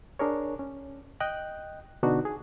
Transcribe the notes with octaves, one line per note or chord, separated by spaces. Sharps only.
D4 G#4 A#4 C#5
C#4
D#5 G5 F#6
B2 D3 B3 D4 D#4 F#4
G#4